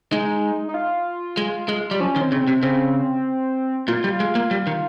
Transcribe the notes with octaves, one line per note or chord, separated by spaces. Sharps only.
G#3 D#4
D#4
F4
G#3
G#3
G3
F3 C#4
D#3
C4
C#3
C4
C3
C#3 C4
A#2 F4
G3
G#3
A#3
G3
D#3